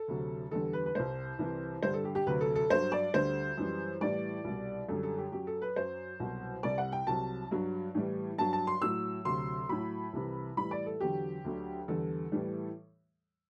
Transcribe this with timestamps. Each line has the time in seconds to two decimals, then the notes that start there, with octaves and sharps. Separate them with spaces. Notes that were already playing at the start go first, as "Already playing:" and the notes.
Already playing: A4
0.08 D2 C3 F#3
0.51 E2 D3 G3 A4
0.73 B4
0.86 B4
0.95 C2 C3 G3 C5
1.39 C2 C3 E3 G3
1.83 G2 D3 G3 C5
1.94 A4
2.05 G4
2.15 G4
2.26 D2 C3 F#3 B4
2.41 A4
2.55 A4
2.70 G2 F#3 C5
2.92 D5
3.14 D2 D3 G3 C5
3.58 F#2 E3 G3
4.01 A2 E3 G3 D5
4.44 C2 B2 G3
4.88 F#2 D3 G3 A4
5.03 A4
5.18 G4
5.32 F#2 F#3 G4
5.47 A4
5.62 B4
5.76 F#2 F#3 C5
6.20 C2 B2 F#3
6.63 C2 C3 G3 D5
6.78 F#5
6.92 G5
7.07 C2 C3 F#3 A5
7.51 G2 F#3
7.95 A2 E3 G3
8.38 G2 F#3 A5
8.53 A5
8.67 C6
8.82 A2 F#3 E6
9.25 D2 C3 F#3 C6
9.69 A2 F#3 B5
10.13 C2 C3 E3
10.57 A2 E3 G3 B5
10.71 D5
10.86 A4
11.00 E2 D3 F#3 G4
11.44 D2 D3 F#3
11.88 E2 D3 G3 A4
12.32 A2 E3 G3